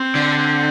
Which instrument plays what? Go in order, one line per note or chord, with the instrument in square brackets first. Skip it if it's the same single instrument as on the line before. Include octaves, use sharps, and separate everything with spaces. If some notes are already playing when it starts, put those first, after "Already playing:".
Already playing: [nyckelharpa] C4
[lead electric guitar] D3